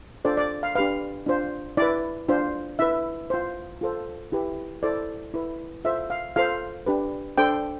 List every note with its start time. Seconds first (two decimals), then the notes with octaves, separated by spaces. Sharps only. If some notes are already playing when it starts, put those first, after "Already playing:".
0.25 D4 F4 A4 C5 D5
0.37 D5
0.63 F5
0.75 D4 G4 B4 F5
1.26 D4 F4 C5
1.77 E4 B4 D5
2.28 D4 F4 C5
2.79 E4 B4 E5
3.30 F4 C5
3.81 F4 A4 C5
4.32 E4 G4 B4
4.83 E4 A4 C5 D5
5.34 E4 B4
5.85 F4 A4 C5 E5
6.10 F5
6.36 F4 A4 C5 F5
6.87 D4 G4 B4
7.38 D4 A4 C5 G5